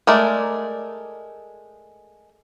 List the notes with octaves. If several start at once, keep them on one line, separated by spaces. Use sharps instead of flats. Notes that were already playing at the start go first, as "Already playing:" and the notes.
G#3 A3 A#4 D5